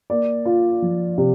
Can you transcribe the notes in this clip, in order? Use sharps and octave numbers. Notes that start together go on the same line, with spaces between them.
A#3 D5
F4
F3
C3